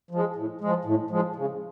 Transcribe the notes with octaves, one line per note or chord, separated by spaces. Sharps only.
F3 G#3
A2
F3 G#3
A2
F3 G#3
C#3